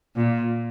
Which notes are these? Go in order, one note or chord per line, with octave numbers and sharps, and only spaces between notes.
A#2